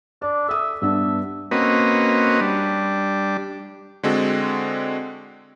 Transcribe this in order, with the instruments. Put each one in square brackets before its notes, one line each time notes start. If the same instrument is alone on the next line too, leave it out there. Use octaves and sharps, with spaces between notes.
[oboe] D4 [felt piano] D5
[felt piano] A4 D#6 [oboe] E5
[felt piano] G2 B3 D4 [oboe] E5
[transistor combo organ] A#3 C4 C#4 F#4 B4 D#5
G3 D4
[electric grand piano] D3 G#3 C4 F#4 A4